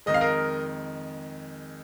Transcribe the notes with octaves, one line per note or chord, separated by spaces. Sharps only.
F2 D#3 G#3 D#5
F5
A#4 D#5